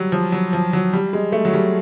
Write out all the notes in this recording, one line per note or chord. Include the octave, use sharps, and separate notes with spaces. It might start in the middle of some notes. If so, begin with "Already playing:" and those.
Already playing: F#3 G3
F3
F#3
F3
F#3
G3
G#3
A3
F#3
G3